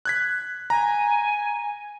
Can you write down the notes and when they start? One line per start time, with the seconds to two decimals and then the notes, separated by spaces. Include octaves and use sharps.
0.05 F#6 G#6 B6
0.70 G#5 A#5